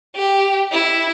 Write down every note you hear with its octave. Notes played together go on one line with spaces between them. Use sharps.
G4
E4